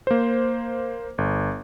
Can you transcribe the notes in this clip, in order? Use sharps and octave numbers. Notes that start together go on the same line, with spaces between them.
A#3 C5
G1